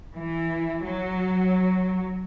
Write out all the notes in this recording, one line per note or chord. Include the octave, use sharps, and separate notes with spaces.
E3
F#3